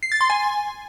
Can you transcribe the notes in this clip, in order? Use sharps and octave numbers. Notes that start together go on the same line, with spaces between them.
C7
A6
C6
G#5